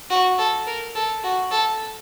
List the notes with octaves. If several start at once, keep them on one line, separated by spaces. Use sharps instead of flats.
F#4
A4
A#4
A4
F#4
A4